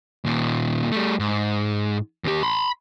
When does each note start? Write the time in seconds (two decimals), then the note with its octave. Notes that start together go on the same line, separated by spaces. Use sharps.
0.25 D#2 A#2
0.92 G3 A3
1.20 G#2
2.24 D#2 G4
2.43 B5 C6